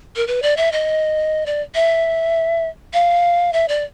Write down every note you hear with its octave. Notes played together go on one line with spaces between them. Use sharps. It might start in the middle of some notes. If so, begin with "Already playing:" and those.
A#4
B4
D5
E5
D#5
D5
E5
F5
E5
D5